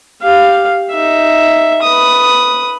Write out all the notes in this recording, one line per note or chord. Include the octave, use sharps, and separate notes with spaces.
G4 F5
D#4 E5
B4 D#6